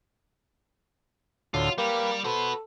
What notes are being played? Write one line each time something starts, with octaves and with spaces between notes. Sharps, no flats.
D2 A2 D3 F#3 F4
G3 A#3 G4 B4
F#4 A4 B4 C5